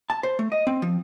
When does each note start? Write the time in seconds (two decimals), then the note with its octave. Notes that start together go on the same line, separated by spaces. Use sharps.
0.10 A5
0.23 C5
0.39 A3
0.52 D#5
0.67 C4
0.82 F3